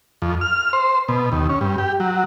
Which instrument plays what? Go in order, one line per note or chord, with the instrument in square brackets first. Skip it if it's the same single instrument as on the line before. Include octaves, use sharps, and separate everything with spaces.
[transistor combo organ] F2
F6
C5
B2
D#2
C#4
G2
G4
F#3